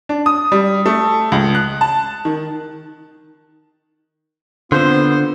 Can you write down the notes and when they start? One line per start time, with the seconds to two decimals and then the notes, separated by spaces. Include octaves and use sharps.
0.09 D4
0.26 D#6
0.52 G3
0.86 A3
1.32 C#2
1.55 F#6
1.81 A5
2.25 D#3
4.72 D3 B3 C4 F4 C5 C6 G6